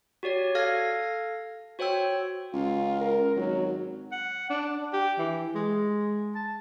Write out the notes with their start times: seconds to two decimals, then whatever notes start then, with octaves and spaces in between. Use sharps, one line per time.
0.23 F#4 G4 C#5 D5
0.55 A4 F5 F6 G#6 A#6
1.79 F#4 C5 C#5 G5 E6
2.54 C#2 F4
3.00 A#4
3.36 G#1 F#3
4.12 F#5
4.50 D4
4.93 G4
5.19 E3
5.55 G#3
6.35 A5